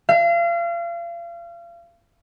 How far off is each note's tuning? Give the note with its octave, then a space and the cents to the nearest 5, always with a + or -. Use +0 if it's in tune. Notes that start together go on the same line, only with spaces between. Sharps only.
F5 -35